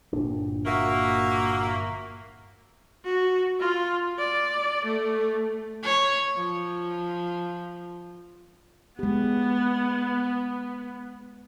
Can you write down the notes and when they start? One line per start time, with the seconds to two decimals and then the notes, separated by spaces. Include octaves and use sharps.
0.13 G1 A#2 D4
0.66 A#3 F#4 E5
3.04 F#4
3.60 F4
4.18 D5
4.84 A3
5.82 C#5
6.36 F3
8.99 G#3 B3 G4